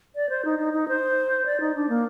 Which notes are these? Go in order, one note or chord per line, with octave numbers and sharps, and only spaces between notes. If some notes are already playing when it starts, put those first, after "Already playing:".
D5
C5
D#4
D#4
D#4
C5
D5
D#4
D4
A#3